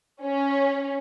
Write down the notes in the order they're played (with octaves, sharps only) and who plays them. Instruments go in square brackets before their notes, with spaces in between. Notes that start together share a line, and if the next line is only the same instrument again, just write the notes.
[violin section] C#4